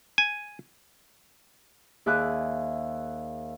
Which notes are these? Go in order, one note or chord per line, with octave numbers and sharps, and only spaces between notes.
G#5
D#2 G#4 E5 G#5 D6 F#6